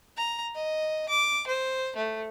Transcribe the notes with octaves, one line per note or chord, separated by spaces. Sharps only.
A#5
D#5
D6
C5
A3